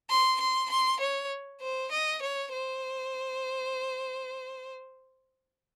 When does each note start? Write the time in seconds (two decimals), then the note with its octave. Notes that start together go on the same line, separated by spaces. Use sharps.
0.10 C6
0.40 C6
0.70 C6
1.00 C#5
1.61 C5
1.92 D#5
2.22 C#5
2.52 C5